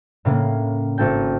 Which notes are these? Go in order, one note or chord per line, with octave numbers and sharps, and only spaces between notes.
A2 C#3 A#3
G#1 A4 G5